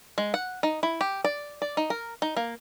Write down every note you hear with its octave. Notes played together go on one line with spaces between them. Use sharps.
G#3
F#5
D#4
E4
G4
D5
D5
D#4
A#4
D#4
A#3